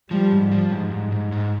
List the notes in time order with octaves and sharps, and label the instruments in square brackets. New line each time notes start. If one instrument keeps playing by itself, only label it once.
[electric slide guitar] F3 [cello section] G3
[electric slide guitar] G#2
F3
G#2
G#2
G#2
G#2